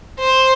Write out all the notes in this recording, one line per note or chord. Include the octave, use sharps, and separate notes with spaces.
C5